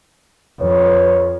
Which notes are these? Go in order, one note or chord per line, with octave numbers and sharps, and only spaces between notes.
F2 B4 C#5